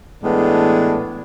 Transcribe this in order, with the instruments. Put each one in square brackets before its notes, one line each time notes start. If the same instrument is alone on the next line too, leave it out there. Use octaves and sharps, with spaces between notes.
[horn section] A2 E3 G#3 B3 D4